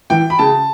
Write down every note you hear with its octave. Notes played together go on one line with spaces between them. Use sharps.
E3 G5
B5
C#3 A5